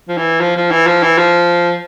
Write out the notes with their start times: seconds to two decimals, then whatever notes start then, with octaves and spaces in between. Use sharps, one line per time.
0.09 F3
0.17 E3
0.41 F3
0.56 F3
0.71 E3
0.87 F3
1.03 E3
1.18 F3